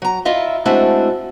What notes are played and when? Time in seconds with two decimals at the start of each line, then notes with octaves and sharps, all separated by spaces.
0.02 F#3 A#5
0.25 E4 F4 D#5 E5
0.65 G#3 A3 C4 D4 E4 F#4